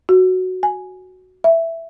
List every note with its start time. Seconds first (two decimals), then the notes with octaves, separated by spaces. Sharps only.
0.09 F#4
0.63 G#5
1.44 E5